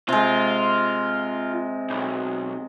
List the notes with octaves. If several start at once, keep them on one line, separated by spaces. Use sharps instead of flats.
C3 G#3 F4
B1